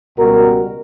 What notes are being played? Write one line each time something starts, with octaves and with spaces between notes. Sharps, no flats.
C#2 B2 G3 F#4 A#4